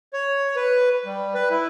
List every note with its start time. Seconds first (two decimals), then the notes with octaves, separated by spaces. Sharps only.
0.13 C#5
0.56 B4
1.06 G3
1.35 B4
1.50 E4